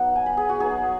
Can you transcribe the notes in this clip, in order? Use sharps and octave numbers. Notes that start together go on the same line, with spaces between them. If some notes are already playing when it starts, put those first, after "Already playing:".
Already playing: F#3 B3 D#4 F#5
G#5
B5
G#4
F#4
F#3 B3 D#4 G#4